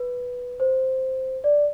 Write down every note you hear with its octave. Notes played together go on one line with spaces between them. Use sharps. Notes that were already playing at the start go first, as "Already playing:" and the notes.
Already playing: B4
C5
D5